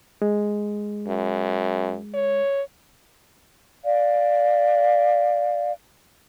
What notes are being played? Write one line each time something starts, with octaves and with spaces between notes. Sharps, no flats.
G#3
F#2
C#5
D5 F5